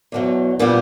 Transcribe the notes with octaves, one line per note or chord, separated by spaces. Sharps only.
E2 B2 F#3
A#2 G3 B3